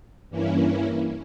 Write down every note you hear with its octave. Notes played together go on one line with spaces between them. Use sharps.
G2 E3 A#3 C#4 E4